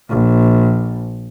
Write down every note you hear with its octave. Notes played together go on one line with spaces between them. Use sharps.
A#1